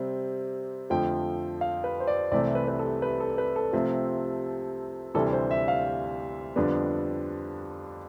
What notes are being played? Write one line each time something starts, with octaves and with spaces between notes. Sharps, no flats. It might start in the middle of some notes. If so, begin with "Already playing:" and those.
Already playing: C3 G3 C4
F2 D3 F3 A3 G5
F5
B4
C5
D5
C2 C3 E3 A3 C4 D5
B4
B4
A4
B4
A4
B4
A4
C3 F3 A3 C4
D2 C3 E3 G3 D4 A4
C5
E5
F5
F2 D3 G3 B3 D4